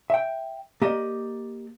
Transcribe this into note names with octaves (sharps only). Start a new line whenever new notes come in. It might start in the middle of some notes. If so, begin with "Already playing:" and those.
E5 G5
A#3 G4 D5 D#5